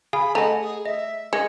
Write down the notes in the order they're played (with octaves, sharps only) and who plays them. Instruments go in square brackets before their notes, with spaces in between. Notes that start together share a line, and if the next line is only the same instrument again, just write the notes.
[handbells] G#4 F5 G#5 [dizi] B5
[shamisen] A3 [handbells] D#5 G#5 A#5 [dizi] F#5
[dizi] G#4
[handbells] D#5 [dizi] E5
[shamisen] G#3 [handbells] A#6 C#7